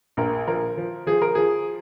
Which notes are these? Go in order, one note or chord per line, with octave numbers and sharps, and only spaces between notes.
A#1 A#4
F3 A#4
F3
F3 G#4
A#4
F3 G#4